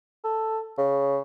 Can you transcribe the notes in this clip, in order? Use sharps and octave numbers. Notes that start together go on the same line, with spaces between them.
A4
C#3